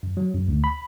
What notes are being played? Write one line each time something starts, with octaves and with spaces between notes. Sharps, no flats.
F#2
F#3
F#2
D2
B5